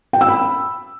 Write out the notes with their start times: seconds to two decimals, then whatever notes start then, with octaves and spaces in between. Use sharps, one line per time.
0.13 G5
0.21 E6
0.29 B5